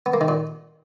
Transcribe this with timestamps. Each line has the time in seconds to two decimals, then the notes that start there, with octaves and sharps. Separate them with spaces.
0.06 B3
0.14 A#3
0.21 D#3
0.28 A#2